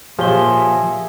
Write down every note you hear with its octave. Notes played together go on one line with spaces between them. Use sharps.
A#2 F3 G4 G#4 C#5 E5 G7